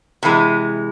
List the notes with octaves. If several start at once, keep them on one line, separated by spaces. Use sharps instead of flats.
C3 E3 G#3